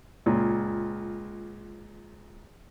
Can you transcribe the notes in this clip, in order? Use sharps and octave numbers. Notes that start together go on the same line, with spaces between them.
C#2 A#2